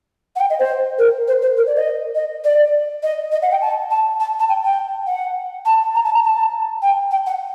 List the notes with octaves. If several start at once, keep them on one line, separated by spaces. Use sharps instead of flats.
F#5
G5
D#5
C5
A#4
C5
C5
A#4
D5
D#5
D#5
D5
D#5
D#5
F#5
G5
A5
A5
A5
A5
G5
G5
F#5
A5
A#5
A5
A#5
A5
G5
G5
F#5